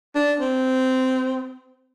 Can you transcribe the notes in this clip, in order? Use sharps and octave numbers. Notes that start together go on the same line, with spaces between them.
D4
C4